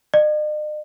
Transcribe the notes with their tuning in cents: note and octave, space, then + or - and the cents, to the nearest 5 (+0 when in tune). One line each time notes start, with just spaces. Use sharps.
D#5 -45